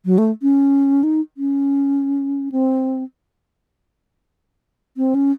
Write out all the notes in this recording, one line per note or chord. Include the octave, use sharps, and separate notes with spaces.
F#3
A3
C#4
D#4
C#4
C4
C4
C#4